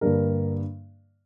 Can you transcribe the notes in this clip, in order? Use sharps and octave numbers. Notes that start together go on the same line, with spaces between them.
G2 D3 G3 A#3 D4 A#4